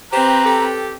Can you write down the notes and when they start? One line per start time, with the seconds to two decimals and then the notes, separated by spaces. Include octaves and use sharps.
0.12 C4 G4 B4 C5 A#5
0.45 G4 A4